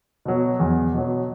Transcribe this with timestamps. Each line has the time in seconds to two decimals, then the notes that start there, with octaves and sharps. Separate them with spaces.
0.25 B2 F#3
0.60 E2
0.94 B2 F#3